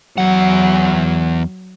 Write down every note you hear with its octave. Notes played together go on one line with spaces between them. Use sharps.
E2 F#3 F#5